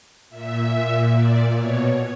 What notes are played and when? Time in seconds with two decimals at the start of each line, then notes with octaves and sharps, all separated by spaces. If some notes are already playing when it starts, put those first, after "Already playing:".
0.29 A#2 E5
0.71 A#2
1.12 A#2 D5
1.53 B2 C#5